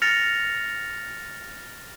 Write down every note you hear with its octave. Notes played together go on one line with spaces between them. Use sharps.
F6 A6 A#6 C#7 F7